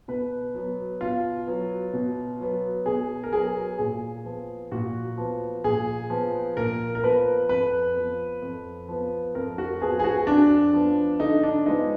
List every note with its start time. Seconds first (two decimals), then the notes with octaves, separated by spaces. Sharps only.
0.08 B2 B4
0.54 F#3 B3
1.01 B2 F4
1.47 F#3 B3
1.93 B2
2.40 F#3 B3
2.86 B2 G#4
3.24 A#4
3.32 F#3 B3 G#4
3.78 A#2 G#4
4.25 F3 B3
4.72 A#2 F#4
5.18 F3 B3
5.64 A#2 G#4
6.10 F3 B3
6.57 A#2 A#4
6.95 A#4
7.04 F3 B3 B4
7.49 F2 B4
7.96 F3 B3
8.42 F2
8.89 F3 B3
9.35 F2 A#4
9.58 F#4
9.81 F3 B3 G#4
9.99 G#4
10.04 F#4
10.27 F2 D4
10.74 F3 B3
11.20 D3 D#4
11.43 D4
11.66 F3 G#3 B3 D#4